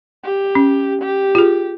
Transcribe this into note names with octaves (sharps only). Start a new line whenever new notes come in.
G4
C#4
G4
F4 G#4